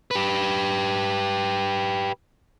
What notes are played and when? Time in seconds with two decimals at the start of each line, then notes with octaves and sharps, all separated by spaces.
0.11 G4 B4